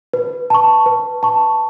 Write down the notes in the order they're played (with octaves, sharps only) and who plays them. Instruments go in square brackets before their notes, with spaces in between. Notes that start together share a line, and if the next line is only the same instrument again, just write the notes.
[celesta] B4
A5 C#6
B4
A5 C#6